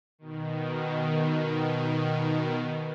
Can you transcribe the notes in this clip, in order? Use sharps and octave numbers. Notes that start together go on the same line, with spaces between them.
B2 D#3